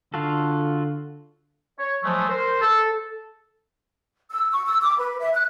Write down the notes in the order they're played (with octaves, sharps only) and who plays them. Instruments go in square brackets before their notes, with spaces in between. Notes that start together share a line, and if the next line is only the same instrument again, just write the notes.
[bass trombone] D3 [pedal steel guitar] F4 F#4 A4
[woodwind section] C#5
F3 F#3 G#3 A3
A#4 C5
A4
[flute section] E6
C#6
E6
D6
B4
E5
F#6